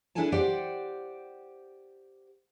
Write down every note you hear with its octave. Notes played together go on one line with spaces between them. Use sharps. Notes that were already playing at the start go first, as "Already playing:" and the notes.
D4 E4 G#4 A4 G#5 A5
G4 C5 D5 F#5 G5